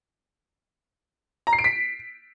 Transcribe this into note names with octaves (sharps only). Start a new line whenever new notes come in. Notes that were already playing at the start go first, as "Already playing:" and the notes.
A#5
C7
D7
B6